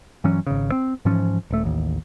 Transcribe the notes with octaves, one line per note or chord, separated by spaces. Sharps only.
G2 E3 F#3 C#4
G#1 C#3
C4
G#2 E3 F3 C#4
D#1 A3
A1 D#2